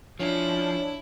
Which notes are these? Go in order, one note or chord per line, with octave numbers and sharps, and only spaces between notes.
F3 C#4 D4 E4